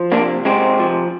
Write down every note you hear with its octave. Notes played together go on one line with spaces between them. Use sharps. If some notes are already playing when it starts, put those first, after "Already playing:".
Already playing: F3
C3 A#3 D4
C3 G#3 C4
F3